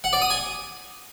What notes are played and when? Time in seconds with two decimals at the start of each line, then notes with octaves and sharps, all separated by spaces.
0.04 F#5
0.13 D5
0.22 D#6
0.30 G#5